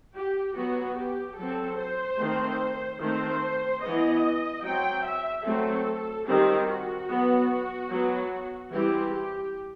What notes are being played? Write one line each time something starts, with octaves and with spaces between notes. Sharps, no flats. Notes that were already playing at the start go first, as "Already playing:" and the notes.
G4
F#3 B3 F#4
G4
F#3 C4 A4
C5
D#3 A3 C4
D#3 A3 C4 C5
E3 B3 D#5
F#3 C4 G5
E5
F#3 A3 C4 A4
D#3 G3 C4 G4
F#4
F#3 B3
F#3 B3
E3 G3 C4 G4
G4